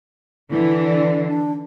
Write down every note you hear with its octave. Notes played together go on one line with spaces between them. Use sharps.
D3 E3 E4
D5
D4